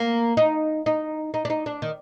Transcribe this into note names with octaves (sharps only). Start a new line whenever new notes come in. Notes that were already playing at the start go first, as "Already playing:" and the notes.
Already playing: A#3
D#4
D#4
D#4
D4
D#4
D4
D#3